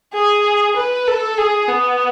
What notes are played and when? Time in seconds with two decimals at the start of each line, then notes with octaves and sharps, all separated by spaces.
0.13 G#4
0.76 B4
1.07 A4
1.38 G#4
1.69 B3